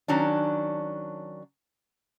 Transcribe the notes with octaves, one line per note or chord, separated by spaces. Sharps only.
D#3 F#3 C#4 D4